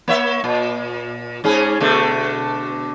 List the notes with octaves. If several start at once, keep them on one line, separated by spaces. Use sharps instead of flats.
A#3 C#5 E5
A#2
G#2 C#4 G#4
B2 D3 A3